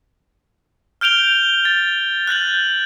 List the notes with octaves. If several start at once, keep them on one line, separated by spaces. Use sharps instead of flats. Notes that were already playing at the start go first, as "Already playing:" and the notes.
F6 G6 D7 F7 G7
A6
F#6 G6 A6 F#7